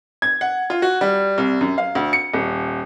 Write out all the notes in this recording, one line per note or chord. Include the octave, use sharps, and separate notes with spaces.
G#6
F#5
F4
F#4
G3
C2
F#2
F5
D2
C#7
D#1